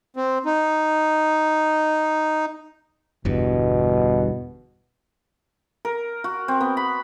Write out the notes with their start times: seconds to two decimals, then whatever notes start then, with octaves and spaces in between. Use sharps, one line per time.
0.16 C4
0.46 D#4
3.25 G1 E2 G2 B2
5.85 A#4
6.24 F#4
6.48 C4
6.61 B3
6.77 B5